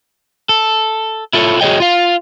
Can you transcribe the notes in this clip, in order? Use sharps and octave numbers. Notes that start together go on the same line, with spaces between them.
A4
E4 F4 A4 C5 C#5
F#4 G#4 A4 C#5 D#5 G5
F4 F5